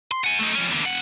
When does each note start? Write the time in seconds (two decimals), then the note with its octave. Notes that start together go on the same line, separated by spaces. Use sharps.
0.12 C6
0.24 F#5 G#5
0.39 A3 D#4
0.55 F2 C#4
0.72 E2 D3
0.85 F2 F#5